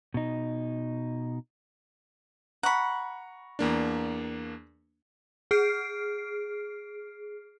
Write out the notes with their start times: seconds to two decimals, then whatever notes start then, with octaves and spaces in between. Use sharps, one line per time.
0.14 B2 D#4
2.63 F#5 A#5 B5 C#6
3.59 E2 A#3 D4
5.51 G#4 F6 C7 D7